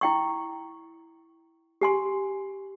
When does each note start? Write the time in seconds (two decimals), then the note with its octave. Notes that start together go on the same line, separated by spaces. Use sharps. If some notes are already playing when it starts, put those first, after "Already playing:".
0.01 E4 G5 C#6
1.81 G4 G#5 C6